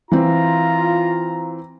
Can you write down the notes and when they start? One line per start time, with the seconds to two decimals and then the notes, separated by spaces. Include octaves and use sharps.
0.12 E3 C4 F4 A#5